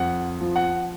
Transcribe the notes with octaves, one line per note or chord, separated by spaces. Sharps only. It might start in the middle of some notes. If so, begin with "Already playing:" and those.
Already playing: F2 F#5
F3
F#5